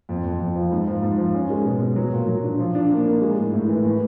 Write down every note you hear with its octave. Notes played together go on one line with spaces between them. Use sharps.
F2
F2
F2
F3
G#2
F3
G#2
F3
C#4
G#3
B2
B2
F#3
A#2
F#3
D4
F3
D4
A#3
A#3
G#3
A2
A2
E3
A2